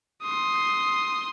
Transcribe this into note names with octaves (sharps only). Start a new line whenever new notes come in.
C6 D#6